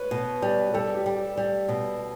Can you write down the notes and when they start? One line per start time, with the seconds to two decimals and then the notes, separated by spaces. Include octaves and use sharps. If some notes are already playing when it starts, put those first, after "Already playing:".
Already playing: B4 C#5
0.11 B2
0.42 G3
0.74 G3 A4
0.95 G4
1.06 G3
1.16 G4
1.37 G3
1.69 B2